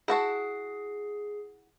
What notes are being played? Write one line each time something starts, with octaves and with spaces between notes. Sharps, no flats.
E4 F#4 G#4 A5 C7